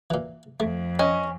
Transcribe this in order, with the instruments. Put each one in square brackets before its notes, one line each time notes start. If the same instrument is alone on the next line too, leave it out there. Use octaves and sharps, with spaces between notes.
[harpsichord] A#2 E3
[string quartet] F2 [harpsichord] A3
[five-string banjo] C#4 [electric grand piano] D#5 [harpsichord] G#5